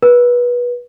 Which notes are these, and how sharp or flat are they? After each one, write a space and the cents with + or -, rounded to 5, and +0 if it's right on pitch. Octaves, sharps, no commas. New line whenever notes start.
B4 -25